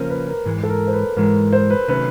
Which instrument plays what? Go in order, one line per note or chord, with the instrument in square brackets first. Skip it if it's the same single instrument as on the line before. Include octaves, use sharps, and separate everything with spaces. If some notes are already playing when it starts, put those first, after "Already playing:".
Already playing: [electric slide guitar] C#3 F3 A#3 C#4 [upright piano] A#4 C5
[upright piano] B4
A#4
[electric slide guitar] G#2 E3 G#3
[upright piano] A4
A#4
C5
B4
[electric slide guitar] G#2 E3 G#3 [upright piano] A#4
[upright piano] C5
B4
[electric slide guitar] C3 D#3 F#3 A3 C#4 [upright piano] B4